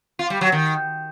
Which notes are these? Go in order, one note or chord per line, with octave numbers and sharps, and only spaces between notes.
F4
G3
F#3
D#3